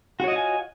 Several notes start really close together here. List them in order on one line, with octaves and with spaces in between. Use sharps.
F#4 C#5 D#5 F4 G#5